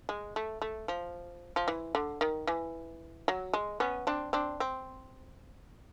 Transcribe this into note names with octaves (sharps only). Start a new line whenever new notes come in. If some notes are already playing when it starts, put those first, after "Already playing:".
G#3
A3
A3
F3
F3
E3
D3
D#3
E3
F#3
G#3
B3 C#4
C4 D4
C4 D4
C4